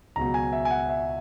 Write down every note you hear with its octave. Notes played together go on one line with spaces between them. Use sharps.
C#2 B2 F#3 A#5
G#5
E5
G#5
F#5
E5